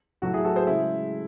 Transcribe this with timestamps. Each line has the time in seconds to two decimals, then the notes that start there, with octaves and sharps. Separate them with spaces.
0.22 A2 F#3 A3 F#4
0.33 E4 G#4
0.44 F#4 A4
0.56 G#4 C5
0.67 C#3 G#3 E4